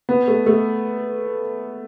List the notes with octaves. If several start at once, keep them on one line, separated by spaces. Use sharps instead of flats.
B3
A3
A3